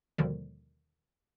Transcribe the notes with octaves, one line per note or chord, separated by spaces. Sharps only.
D#2 B2 D3 D#3 F3 G3